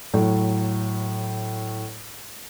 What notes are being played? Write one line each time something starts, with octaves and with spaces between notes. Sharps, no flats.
A2 F#3